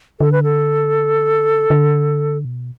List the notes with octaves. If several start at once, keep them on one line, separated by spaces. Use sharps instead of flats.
D3 A4
B4
A4
D3
B2